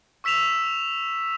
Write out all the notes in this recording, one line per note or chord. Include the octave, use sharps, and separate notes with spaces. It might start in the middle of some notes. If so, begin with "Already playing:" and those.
C#6 E6 B6 E7 F7